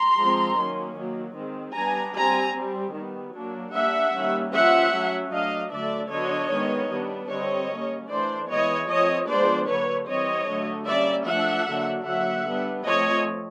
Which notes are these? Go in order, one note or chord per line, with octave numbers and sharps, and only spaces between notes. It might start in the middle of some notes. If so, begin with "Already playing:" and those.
Already playing: A#5 C6
F3 G#3 C4
D#3 F#3 A#3 C#4
D#3 F#3 A#3
D#3 G#3 C4
G3 B3 D4 G#5 A#5
G3 C4 G#5 A#5
G3 C4
D#3 G3 B3
F#3 A#3 D4
G3 A#3 D4 E5 F#5
D#3 G3 A#3 C#4
F3 A#3 C#4 E5 F#5
F#3 A3 C#4
F#3 A3 D4 D#5 F5
D3 F#3 A3 D4 D5 E5
D3 F#3 B3 D4 C#5 D#5
D#3 G#3 B3
G3 B3 D4
D3 G3 C4 C#5 D#5
G3 A#3 C#4
E3 A3 D4 C5 D5
E3 G#3 B3 C#5 D#5
F3 A3 C4 C#5 D#5
F3 G#3 B3 D4 C5 D5
D3 F#3 A#3 B4 C#5
E3 G3 C4 C#5 D#5
D3 F#3 A3
G3 A#3 C#4 D5 E5
F3 A3 D4 E5 F#5
D3 F#3 A#3 D4
D3 F#3 A#3 E5 F#5
G3 B3 D4
F3 A3 C4 C#5 D#5